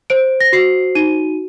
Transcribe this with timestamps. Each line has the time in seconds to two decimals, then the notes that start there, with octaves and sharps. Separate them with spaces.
0.10 C5 D7
0.41 A#6
0.53 F#4 C7
0.95 D#4 D#7